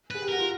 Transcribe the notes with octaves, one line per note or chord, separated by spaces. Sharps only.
G#4 B4
G4
F#4 A#4
F4